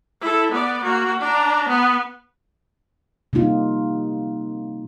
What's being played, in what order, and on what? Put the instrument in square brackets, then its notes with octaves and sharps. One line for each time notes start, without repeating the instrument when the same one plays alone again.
[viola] E4 A4
B3 D5
A#3 F#4
D4 A#5
B3
[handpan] C3 G3 A#3 D#4 F4